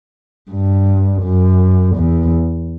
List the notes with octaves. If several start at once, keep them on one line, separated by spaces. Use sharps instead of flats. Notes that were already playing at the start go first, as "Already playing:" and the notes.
G2
F#2
E2